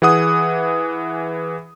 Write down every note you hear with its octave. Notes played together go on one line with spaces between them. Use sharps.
E3 G#4 F#5 D#6